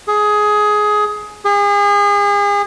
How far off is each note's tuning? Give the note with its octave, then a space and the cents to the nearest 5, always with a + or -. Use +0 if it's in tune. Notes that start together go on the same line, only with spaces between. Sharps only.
G#4 +15
G#4 -35